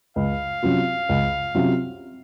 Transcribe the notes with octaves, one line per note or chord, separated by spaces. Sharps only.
C#2 F5
C3 F#3 C#4 F4
C#2
C3 F#3 C#4 F4